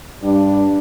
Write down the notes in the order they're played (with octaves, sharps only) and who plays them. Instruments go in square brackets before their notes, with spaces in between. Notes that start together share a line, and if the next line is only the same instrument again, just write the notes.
[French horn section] G2 G3 D4